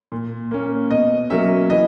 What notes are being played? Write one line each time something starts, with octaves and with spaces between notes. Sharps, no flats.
A#2
A#3 C#4
B2 D#5
F#3 A#3 C#4 E5
E3 D#5